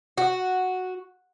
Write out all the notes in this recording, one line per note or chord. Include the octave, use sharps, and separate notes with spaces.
F#4